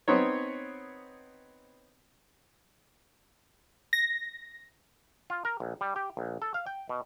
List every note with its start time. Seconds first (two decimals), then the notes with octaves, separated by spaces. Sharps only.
0.08 B3 C4 D#4 C#5
3.93 A#6
5.30 F4
5.45 A#4
5.60 A#1
5.81 G3
5.96 G4
6.17 A#1
6.42 A4
6.54 F5
6.66 G5
6.89 B2